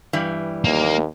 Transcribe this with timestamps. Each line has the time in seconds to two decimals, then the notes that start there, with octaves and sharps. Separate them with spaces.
0.13 G2 E3 G3
0.64 D#2 A#3